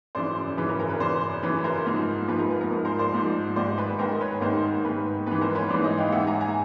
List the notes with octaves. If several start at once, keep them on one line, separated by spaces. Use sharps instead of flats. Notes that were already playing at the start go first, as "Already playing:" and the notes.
F#2 C#3 E3 C5 D5
F#2 C#3 E3 B4
A#4
A#4
B4
F#2 C#3 E3 C5 D5
F#2 C#3 E3 B4 C#5
A#4 C5
G#2 F3
G#2 F3 B4
A#4
B4
A#4
G#2 F3
A#4 C5
C5 D5
G#2 F3
G#2 D#3 C5 D5
B4
G#2 D#3 A#4 C5
B4 C#5
G#2 D#3 A#4 C5
G#2 D#3 B4
G#2 E3 B4
A#4 C5
B4 C#5
G#2 E3 C5 D5
C#5 D#5
F5 G5
G#2 E3 E5 F#5
G#5 A#5
G#5 A#5